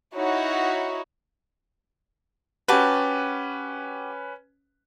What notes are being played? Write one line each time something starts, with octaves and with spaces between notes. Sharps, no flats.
D#4 E4 F#4 C#5
C#4 F#4 G4 B4 A5